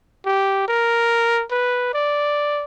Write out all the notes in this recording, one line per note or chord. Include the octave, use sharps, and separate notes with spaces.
G4
A#4
B4
D5